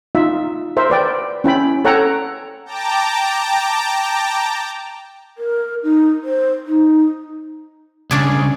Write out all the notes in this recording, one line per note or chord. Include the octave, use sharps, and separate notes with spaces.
D#4 F4 E5
A#4 C5 E5
B4 D5 G5
C#4 E4 G5 B5
A4 C#5 F#5 G5 A#5
G5 A5 A#5 D6
A#4
D#4
C5
D#4
C2 C#3 C#4 D4 G#4